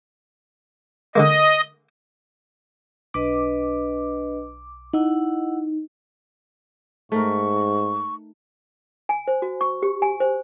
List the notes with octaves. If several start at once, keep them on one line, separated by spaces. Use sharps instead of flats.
D3 G#3 A#3 D#5
B1 D4 B4 D#5 D6
D#4 E4 F#5
G#2 A3 D#4 A#4 C#6
G#5
C5
F#4
C#6
G4
G#5
C5